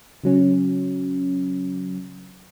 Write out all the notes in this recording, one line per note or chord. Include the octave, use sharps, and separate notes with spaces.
C#3 F#3 C#4